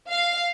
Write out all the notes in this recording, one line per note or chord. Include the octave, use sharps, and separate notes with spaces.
F5